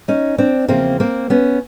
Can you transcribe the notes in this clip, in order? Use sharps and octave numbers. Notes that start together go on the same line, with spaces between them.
C#4 D#4
C4 D4
E2 C#3 F3 A#3 C4
A#3 C4
B3 C#4